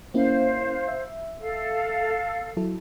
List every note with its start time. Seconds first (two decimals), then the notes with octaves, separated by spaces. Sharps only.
0.14 A#3 C#4 E4 C5 F5
0.88 E5
1.40 A4 F5
2.57 F#3 E4 A4